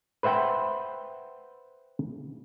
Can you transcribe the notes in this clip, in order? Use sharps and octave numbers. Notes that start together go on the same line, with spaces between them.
B4 C5 E5 F#5 G5